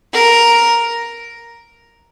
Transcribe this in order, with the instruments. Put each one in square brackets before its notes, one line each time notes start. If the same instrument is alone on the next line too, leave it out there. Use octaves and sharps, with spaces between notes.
[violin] A#4